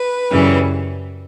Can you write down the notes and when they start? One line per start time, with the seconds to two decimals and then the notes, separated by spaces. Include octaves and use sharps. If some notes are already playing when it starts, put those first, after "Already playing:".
Already playing: B4
0.31 F#2 C#3 E3 G3